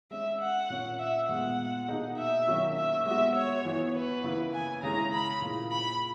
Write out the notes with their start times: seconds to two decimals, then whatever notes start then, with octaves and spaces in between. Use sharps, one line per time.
0.11 G#3 C#4 G#4 E5
0.41 F#5
0.70 A#2 A#3 C#4
0.99 E5
1.29 A#2 G#3 B3 F#5
1.88 B2 A#3 D#4 G#4
2.18 E5
2.47 D#3 F#3 A#3 C#4
2.76 E5
3.06 G#3 B3 F#4 E5
3.35 C#5
3.65 E3 B3 F#4
3.94 B4
4.24 C#3 E3 A#3 E4
4.53 G#5
4.83 C#3 G#3 C#4 E4 G#4 A#5
5.13 B5
5.41 A#2 A#3 E4 G#4
5.71 B5